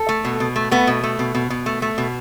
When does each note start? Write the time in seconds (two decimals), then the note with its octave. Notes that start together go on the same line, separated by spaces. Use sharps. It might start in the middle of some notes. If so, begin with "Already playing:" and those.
Already playing: A4
0.09 A3
0.25 B2
0.40 B2
0.56 A3
0.71 A3 B3
0.87 B2
1.03 A3
1.19 B2
1.35 B2
1.50 B2
1.66 A3
1.82 A3
1.98 B2